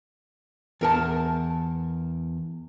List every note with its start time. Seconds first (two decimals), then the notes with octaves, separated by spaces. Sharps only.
0.81 E2 A#4 A5